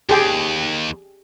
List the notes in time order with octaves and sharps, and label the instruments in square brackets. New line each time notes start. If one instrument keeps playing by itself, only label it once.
[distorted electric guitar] D#2 [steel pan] G4 G#4 G5